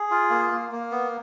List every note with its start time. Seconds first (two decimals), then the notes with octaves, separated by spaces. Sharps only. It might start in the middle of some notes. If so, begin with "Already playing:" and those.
Already playing: G#4
0.11 F4
0.30 A#3
0.51 A#3
0.72 A#3
0.91 B3